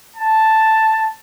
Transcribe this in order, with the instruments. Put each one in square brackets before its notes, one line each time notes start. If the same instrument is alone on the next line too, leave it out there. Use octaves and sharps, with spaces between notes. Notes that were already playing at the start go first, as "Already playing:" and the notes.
[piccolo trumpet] A5